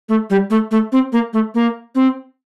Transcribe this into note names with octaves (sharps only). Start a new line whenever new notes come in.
A3
G3
A3
A3
C4
A#3
A3
A#3
C4